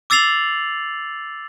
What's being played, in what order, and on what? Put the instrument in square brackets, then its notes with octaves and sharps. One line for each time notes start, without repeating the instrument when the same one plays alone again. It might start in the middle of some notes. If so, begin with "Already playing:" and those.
[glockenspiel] D6 E6 A6 C7 F7 F#7